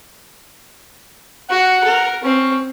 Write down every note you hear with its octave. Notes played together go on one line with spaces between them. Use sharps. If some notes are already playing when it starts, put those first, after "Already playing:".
F#4 F#5
A#4
C4 C#4